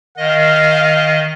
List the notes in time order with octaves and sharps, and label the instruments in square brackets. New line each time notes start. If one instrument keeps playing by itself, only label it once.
[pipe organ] D#3 D#5 [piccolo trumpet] F5